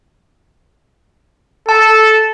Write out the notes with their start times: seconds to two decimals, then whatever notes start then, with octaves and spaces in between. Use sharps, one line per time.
1.69 A4 A5